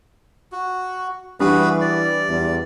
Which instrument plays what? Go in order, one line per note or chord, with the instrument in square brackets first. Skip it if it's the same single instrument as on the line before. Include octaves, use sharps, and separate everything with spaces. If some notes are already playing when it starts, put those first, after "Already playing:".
[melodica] F#4
[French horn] E3 [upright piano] G3 D4 [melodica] F#4 G#4 B4
[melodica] D5
[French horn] E2